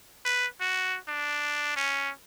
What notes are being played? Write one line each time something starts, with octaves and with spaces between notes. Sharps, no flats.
B4
F#4
D4
C#4